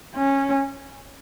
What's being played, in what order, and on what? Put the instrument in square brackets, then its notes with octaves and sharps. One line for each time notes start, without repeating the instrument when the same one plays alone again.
[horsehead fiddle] C#4